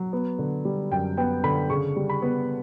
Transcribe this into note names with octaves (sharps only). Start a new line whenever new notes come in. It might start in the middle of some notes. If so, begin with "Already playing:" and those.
Already playing: F#3
B3
D3
G3
F#2 G5
B3 G5
D3 B5
C#3 C#6
G3
B5
B3